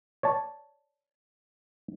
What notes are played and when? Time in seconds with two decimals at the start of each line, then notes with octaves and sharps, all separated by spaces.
0.23 C#5 D5 A5